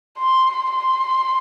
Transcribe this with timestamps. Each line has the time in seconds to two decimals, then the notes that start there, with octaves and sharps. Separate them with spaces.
0.18 C6
0.71 C6